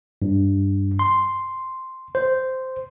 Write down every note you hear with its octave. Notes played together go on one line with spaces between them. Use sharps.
G2
C6
C5